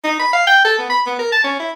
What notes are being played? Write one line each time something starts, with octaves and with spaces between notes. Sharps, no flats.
D#4
B5
F5
G5
A4
B3
B5
B3
A#4
A5
C#4
E4